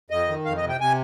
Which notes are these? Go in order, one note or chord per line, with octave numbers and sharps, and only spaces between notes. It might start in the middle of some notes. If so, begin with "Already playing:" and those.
F2 D#5
D#3
F2 F5
D#5
C3
G5
C3 G#5